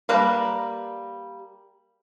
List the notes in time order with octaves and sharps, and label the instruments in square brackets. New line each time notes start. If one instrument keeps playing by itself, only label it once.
[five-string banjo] G3 A#3 B4 A5 A#5